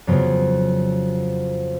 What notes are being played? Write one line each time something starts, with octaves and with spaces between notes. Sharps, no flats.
F2 C#3 F#3 B3